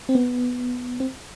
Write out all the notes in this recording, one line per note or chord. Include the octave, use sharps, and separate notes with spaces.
C4
B3
C4